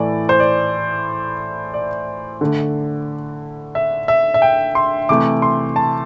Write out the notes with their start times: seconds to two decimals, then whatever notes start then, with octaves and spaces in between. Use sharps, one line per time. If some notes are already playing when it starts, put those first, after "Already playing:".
Already playing: A2 E3 A3 D5
0.29 C5
0.40 D5
1.74 D5
2.41 D3 A3
3.75 E5
4.08 E5
4.34 E5
4.42 G5
4.75 C6
5.09 C3 E3 A3 D6
5.42 C6
5.76 A5